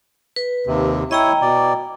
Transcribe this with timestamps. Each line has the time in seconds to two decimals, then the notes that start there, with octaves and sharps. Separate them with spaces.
0.36 B4
0.67 D#2 C3
1.11 E4 C#5 D#5 G5 A#5
1.42 B2 D5